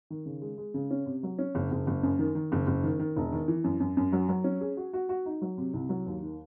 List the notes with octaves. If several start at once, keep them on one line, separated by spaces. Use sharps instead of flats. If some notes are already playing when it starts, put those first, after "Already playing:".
D#3
C#3
G#3
G#3
C#3
C#4
C3
F#3
C#4
F#1
F#1
F#1
F#2
D#3
D#3
F#1
F#1
D#3
D#3
E1
D#3
E3
F#2
F#2
F#2
F#3
F#3
C#4
G#4
F#4
F#4
F#4
D#4
F#3
C3
C2
F#3
D#2
D#3